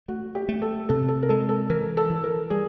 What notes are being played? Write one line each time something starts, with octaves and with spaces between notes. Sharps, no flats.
A3 F#4
G4
A3
A4
C3 A4
A4
A#4
G#3 A4
A4
E3 A#4
A4
E3
A#4
G3 G#4